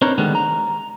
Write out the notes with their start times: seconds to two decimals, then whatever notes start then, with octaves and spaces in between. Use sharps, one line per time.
0.02 C4 D4 D#4 A#4 B4 C#5
0.18 D3 D#3 G3 G#3 B3
0.35 A#5